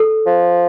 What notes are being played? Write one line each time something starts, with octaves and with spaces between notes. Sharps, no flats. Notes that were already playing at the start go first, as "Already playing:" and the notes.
Already playing: A4
F3